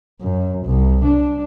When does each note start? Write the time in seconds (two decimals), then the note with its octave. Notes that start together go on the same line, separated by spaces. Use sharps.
0.21 F#2
0.65 C2
1.04 D4